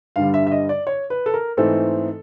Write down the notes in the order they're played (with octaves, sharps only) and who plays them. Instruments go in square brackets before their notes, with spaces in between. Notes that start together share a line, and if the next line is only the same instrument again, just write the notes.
[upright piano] G2 D3 G3 F5
E5
E5
D#5
D5
C#5
B4
A4
A#4
G#2 E3 A3 C4 D#4 A4